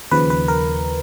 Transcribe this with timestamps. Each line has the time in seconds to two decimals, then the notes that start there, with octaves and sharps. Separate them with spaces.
0.11 D#2 C#3 F3 B4
0.30 B4
0.48 A#4